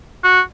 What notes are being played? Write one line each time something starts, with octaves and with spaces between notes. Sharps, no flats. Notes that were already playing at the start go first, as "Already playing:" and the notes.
F#4